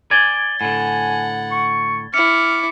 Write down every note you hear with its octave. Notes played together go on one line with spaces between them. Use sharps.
D5 G#5 G#6 A6 G7
A2 D3 F#5 G#5
C#6
E4 D6 F6 C#7